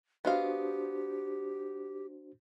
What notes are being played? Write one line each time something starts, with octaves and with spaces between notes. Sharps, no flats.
B3 D4 F#4 G4 C5 D#5 F5